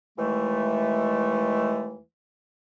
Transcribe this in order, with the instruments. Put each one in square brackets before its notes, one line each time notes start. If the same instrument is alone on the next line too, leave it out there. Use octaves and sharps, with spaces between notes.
[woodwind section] D#2 E3 G#3 A3